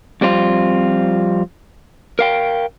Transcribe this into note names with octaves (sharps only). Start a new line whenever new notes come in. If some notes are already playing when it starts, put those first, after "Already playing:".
F2 G3 C4 F4
A#4 F5 G5